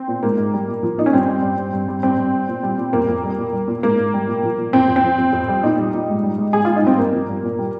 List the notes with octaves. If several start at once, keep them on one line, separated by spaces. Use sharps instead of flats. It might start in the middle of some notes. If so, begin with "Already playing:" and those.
Already playing: C4
A#2
G#2 A#3
G#2
G3
A#2
F3
A#2 D#4
C#4
G2 C4
G3
G2
G2
G2
G3
G2 C4
G2
G3
A#2
G3
A#2
F2 A#3
F2
G3
A#2
G3
A#2
G#2 A#3
G#2
G3
A#2
F3
A#2
F2 C4
F2
C4
F3
F2
F2
G3
A#2 D#4
G3
A#2
G#2
G3
G#2
G#2 G#4
G#2 F4
D#4
G3 C4
G2 A#3
F3
G2
A#2
G3